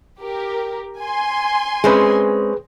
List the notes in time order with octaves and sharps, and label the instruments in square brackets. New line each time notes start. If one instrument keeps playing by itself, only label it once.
[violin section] G4 A#4
G#5 C6
[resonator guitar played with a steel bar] G#3 C4 C#4 [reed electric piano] G#4 B4